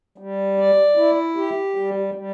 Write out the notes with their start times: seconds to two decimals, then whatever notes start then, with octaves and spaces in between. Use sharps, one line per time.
0.18 G3
0.58 D5
0.97 E4
1.37 G4
1.76 G3
2.14 G3